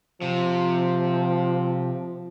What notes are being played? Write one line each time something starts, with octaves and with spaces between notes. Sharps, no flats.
C3 F3